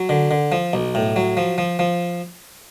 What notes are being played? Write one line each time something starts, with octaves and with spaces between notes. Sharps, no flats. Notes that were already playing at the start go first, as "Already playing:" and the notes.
Already playing: F#3
D3
D3
F3
B1
A2
F#3
F3
F3
F3